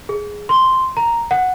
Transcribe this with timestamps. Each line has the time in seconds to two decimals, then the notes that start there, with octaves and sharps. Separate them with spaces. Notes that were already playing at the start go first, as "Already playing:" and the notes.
0.09 G#4
0.49 C6
0.97 A#5
1.31 F#5